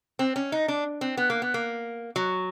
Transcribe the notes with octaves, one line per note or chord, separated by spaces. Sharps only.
C4
C#4
D#4
D4
C4
B3
A#3
B3
A#3
F#3